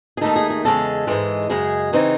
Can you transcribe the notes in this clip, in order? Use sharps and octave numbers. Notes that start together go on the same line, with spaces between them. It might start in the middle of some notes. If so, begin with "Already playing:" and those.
G#4
D#2 D#3 A3 D#4 A4
G#4
G#4
E2 C#3 G#3 C#4 A4
G#2 E3 G#3
F#2 C#3 G#3 G#4
C#3 E3 C4 D#4